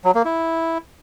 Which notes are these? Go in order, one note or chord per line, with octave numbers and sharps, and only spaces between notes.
F#3
A#3
E4